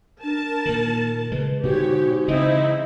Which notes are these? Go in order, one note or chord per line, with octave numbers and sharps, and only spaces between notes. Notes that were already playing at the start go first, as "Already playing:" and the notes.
D4 A#4 A5
A#2 D#3 A#3
C#3 G#3 B4
G#2 B2 D3 F#4 G4 C#5
C#3 E3 C4 D#4 E4 D#5